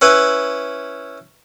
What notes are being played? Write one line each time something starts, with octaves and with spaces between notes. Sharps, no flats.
C#4 E4 B4